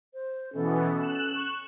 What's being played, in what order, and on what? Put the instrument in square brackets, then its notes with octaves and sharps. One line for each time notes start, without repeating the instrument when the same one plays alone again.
[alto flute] C5
[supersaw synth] B2 E3 B3 [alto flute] C#4 [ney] A4
[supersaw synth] F#6 E7
[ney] C#6